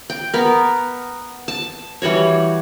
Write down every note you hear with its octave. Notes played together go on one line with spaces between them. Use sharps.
G5
B3 A#4
A5
E3 G3 F#4 C#5